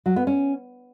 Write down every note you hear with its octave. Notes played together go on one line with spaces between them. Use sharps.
F#3
B3
C#4